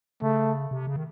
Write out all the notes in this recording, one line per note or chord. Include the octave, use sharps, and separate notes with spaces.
C#3 A3
C3
C#3
D#3